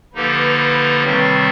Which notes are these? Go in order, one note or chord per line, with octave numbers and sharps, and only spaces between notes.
D3 F3 A#3 D#4 G4 B4
C3 D#3 G3 C4 B4 C#5